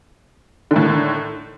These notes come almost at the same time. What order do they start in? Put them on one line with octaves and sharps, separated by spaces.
D3 D#3 A2